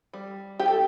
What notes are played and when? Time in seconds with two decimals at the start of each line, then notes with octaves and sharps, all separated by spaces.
0.13 G3
0.59 D#4 G4
0.68 A4